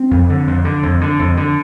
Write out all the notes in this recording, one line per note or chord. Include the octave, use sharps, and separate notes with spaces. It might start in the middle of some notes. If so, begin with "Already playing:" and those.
Already playing: C4
F2
D3
F2
D3
F2
D3
F2
D3